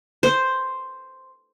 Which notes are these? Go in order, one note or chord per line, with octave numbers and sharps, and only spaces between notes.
C5